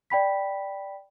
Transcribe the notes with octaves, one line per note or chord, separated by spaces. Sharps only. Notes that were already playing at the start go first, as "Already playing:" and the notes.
D5 G5 B5 B6